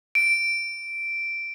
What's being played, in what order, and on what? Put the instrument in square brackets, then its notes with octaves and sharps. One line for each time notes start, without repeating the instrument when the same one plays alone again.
[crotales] D7